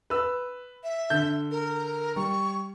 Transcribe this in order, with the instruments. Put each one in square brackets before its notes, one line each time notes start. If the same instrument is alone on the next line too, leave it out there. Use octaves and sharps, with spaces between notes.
[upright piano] B4 E6
[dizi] E5
[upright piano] D3 G6
[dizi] A#4
[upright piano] G3 [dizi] C#6